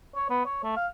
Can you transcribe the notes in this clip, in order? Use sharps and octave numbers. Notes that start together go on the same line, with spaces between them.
C#5
B3
C#5
A3
F5